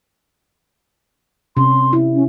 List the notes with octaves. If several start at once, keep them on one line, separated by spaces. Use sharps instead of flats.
C3 C#4 C6
E4
C#4